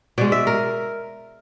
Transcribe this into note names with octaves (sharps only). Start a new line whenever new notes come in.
B2 G#3 D5
E5
A#4